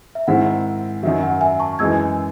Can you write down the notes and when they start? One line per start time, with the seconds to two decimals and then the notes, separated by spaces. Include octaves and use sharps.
0.15 E5
0.27 G#2 D#3 G#3 C4 E4 F#5
1.03 F#2 D#3 F#3 E5
1.23 F#5
1.41 E5 G#5
1.60 A5 C#6
1.79 F#2 E3 G#3 D#4 E6 G#6